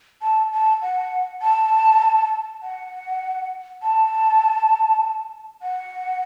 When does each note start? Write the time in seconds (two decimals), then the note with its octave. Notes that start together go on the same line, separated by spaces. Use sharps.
0.22 A5
0.52 A5
0.82 F#5
1.42 A5
2.63 F#5
3.83 A5
5.62 F#5